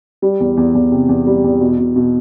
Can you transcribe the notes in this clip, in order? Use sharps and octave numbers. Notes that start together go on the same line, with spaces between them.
G3
E2
E2
E2
C3
E2
G3
E2
B2
B2
B2